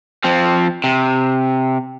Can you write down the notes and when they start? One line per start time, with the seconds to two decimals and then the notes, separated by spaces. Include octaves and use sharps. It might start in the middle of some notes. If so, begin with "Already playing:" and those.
0.24 F3 C4
0.84 C3